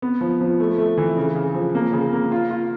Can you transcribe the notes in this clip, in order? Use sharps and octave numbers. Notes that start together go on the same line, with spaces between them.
B3
F3
F3
A3
A3
E3
C#3
C#3
F3
A#3
C#3
A#3
F4
F4